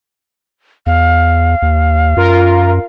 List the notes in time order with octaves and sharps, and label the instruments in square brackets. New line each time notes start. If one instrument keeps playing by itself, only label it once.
[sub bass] E2 [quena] F5
[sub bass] D#2
[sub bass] F#2 [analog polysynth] F4 A#4